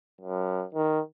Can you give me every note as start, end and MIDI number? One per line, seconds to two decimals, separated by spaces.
0.21 0.64 42
0.75 1.00 51